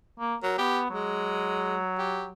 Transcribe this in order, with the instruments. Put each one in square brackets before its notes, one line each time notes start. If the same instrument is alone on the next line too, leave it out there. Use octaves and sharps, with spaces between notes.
[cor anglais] A#3
[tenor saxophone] F#3 [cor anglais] A#4
[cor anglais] B3 [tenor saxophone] G4
[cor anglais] F#3 [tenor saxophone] G#3
[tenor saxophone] G4